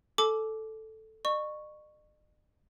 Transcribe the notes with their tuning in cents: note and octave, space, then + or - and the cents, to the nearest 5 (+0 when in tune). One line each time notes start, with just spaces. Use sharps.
A4 +0 A5 -45 D6 +0
D#5 -45 C#6 +0